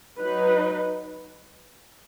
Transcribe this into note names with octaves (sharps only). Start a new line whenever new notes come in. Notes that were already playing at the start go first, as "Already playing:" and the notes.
F#3 D#4 B4